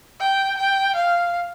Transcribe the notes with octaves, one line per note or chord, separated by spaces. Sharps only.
G5
G5
F5